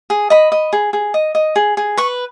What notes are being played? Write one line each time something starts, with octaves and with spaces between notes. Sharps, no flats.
G#4
D#5 B5
D#5
G#4
G#4
D#5
D#5
G#4
G#4
B4 C#6